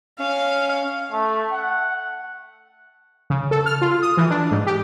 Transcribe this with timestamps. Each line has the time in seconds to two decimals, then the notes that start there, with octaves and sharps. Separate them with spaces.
0.19 C#4 F5
1.12 A3
1.52 F#5
3.30 C#3
3.51 A4
3.66 F6
3.81 F4
4.02 D#6
4.17 E3
4.30 D4
4.51 G#2
4.66 G4